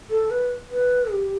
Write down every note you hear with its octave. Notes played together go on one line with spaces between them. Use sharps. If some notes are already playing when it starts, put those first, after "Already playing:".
A4
B4
B4
G4